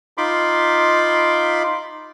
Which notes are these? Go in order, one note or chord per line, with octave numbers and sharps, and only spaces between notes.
D#4 F4 B5 C6 D6